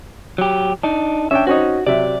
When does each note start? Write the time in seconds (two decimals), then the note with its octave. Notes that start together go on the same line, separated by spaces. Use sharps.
0.38 F#3 G4
0.83 D4 D#4
1.31 C#4 D4 E5 G5
1.47 C4 C#4 D#4 F#4
1.87 C3 F#3 D5 E5